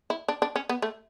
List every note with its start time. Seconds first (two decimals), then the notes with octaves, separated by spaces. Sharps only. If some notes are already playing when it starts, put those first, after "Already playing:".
0.10 E4
0.28 D4
0.42 D4
0.56 C#4
0.69 B3
0.82 A3